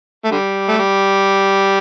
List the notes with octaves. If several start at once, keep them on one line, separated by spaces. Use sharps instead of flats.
A3
D3 G3
A3
G3